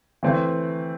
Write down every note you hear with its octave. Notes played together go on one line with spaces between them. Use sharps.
E3 A3 C4